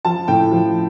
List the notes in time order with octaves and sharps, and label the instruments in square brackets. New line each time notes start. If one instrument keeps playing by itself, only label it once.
[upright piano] F3 A5
A2 G5
F3